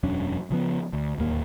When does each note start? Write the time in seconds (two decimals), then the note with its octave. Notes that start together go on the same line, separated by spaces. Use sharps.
0.03 E1 F#2 C#4 D4
0.50 C#3 F3 B3
0.93 D2
1.18 D1 D#2 A#3